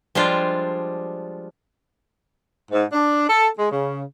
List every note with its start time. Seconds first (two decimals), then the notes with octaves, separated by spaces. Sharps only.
0.15 F3 G3 G#3 D4 F4
2.72 G#2
2.93 D4
3.30 A4
3.59 G#3
3.72 C#3